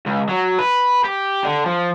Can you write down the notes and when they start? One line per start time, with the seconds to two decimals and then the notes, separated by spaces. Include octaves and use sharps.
0.07 C#2
0.29 F#3
0.58 B4
1.05 G4
1.45 D3
1.66 F3